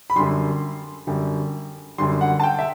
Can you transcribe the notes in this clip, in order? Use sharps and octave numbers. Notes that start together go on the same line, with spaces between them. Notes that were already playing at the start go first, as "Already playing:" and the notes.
B5
F#2 D3 G3 C6
F#2 D3 G3
F#2 D3 G3 C6
F#5
A5
G5
E5